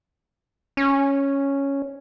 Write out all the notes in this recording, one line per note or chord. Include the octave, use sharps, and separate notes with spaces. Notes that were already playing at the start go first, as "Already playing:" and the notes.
C#4